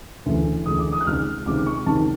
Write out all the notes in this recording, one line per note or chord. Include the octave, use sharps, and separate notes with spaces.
D2 C#3 E3 G#3
D2 C#3 E3 G#3 D#6
D6
D#6
F#6
C#2 C3 D#3 F6
C#2 C3 D#3 D6
C#6
C#2 C3 D#3 A5